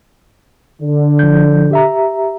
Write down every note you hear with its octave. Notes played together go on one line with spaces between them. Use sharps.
D3
F3 G6
G4 E5 A#5